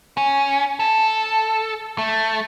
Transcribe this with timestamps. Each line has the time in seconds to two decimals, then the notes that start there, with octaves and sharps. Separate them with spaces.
0.17 C#4
0.80 A4
1.98 A3